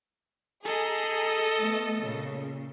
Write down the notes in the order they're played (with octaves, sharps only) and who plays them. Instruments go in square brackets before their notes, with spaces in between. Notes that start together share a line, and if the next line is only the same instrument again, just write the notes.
[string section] G#4 A#5 [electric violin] A4 D#5
[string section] A3 B3
A#2 C#3